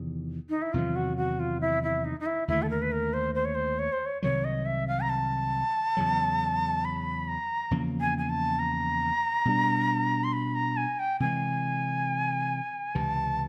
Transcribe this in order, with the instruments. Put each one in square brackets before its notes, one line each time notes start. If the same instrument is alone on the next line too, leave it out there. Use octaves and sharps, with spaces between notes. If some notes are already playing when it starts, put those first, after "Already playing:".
Already playing: [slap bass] E2 C3 D#3
[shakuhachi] D#4
E4
[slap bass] E2 C3 D#3 F#3 [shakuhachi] F4
[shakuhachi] F#4
F#4
F4
E4
E4
D#4
D#4
E4
[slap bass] D#2 D3 F3 A3 [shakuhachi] E4
[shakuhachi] A4
A#4
B4
A#4
C5
C5
C#5
C5
C#5
C5
C#5
[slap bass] C2 C3 D#3 F#3 [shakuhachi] C#5
[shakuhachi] D#5
E5
F5
A#5
A5
[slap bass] E2 C#3 F#3
[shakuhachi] B5
A#5
[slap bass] E2 C#3 F3 A#3
[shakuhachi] G#5
G#5
A5
A#5
[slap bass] B2 G3 A#3 D4
[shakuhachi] C6
B5
A#5
G#5
G5
[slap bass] C3 E3 G#3 [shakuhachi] G#5
[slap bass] C#2 C3 E3 [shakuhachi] A5